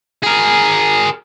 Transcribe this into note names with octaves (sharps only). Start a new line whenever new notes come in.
G#4 A#4